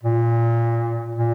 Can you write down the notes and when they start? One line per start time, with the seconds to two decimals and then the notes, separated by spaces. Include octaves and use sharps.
0.03 A#2
1.15 A#2